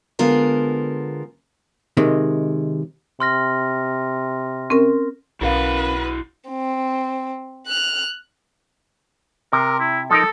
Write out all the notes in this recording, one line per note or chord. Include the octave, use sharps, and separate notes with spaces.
D3 G#3 B3 F4 A#4 C5
C3 D#3 G#3
C3 C6 F6 A#6
C4 C#4 A#4
B1 C#4 E4 F#4 A#4 B4 F5 F#5
C4
F6 F#6
C3 A#4
E4
F3 D#4 A4 A#4